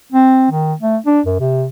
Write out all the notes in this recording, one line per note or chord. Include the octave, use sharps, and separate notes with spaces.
C4
D#3
A3
D4
F#2
C3